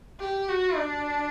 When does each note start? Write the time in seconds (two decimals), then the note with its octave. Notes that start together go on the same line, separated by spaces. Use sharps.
0.20 G4
0.48 F#4
0.77 D4